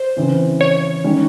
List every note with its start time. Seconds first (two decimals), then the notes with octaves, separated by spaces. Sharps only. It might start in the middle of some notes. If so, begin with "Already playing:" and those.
Already playing: C5
0.16 C#3 E3 C4
0.61 C#5
1.04 D#3 G#3 C#4